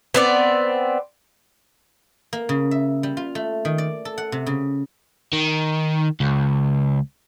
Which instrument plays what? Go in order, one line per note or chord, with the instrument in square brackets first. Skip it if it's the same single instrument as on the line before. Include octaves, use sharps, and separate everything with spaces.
[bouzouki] B3 C4 D5
[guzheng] A#3
C#3
E5
G3
F4
A3
D#3
D5
A4
F#5
C3
C#3
[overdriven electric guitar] D#3
C#2